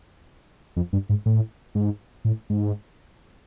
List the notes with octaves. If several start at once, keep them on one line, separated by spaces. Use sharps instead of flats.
F2
G2
G#2
A2
G#2
A2
G#2